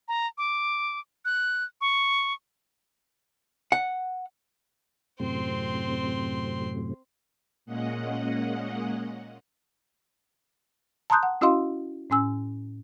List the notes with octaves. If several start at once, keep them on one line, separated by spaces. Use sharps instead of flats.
A#5
D6
F#6
C#6
F#5
F#2 A2 C3 C4 C6
A#2 G#3 A#3 C#4 D#5 F#5
A5 A#5 C6 D#6 F#6 G6
F#5
C#4 E4 F#4 D#5 F5 C6
A2 C#4 G#5 E6